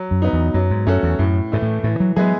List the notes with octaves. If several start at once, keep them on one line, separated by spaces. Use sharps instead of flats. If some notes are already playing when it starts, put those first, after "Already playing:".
Already playing: F#3
F#2
B3 D#4
E2
F#2 F#3
G#2
F#2 A3 C#4 F#4 A4
E2
F#2 A2
G#2 E3 A3
A2
A2 E3
F#3
F#3 G#3 B3 E4 G#4